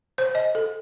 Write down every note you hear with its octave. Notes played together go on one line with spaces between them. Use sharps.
C5
D#5
A4